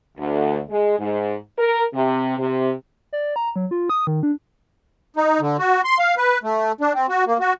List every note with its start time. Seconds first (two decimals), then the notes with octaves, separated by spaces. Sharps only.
0.18 D2
0.70 G#3
0.99 G#2
1.58 A#4
1.93 C3
2.38 C3
3.13 D5
3.36 A#5
3.56 F#3
3.71 F4
3.89 D#6
4.07 D#3
4.23 D4
5.16 D#4
5.40 D3
5.59 F#4
5.84 C6
5.99 F5
6.17 B4
6.43 A3
6.81 D4
6.94 C4
7.09 F#4
7.27 A#3
7.40 F#4